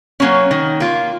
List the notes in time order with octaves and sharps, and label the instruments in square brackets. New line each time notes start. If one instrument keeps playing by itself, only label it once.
[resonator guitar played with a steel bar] F#3 A#3 C#4
D#3
A#3 F4